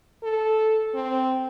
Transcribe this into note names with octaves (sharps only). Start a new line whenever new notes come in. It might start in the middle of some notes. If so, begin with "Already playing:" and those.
A4
C4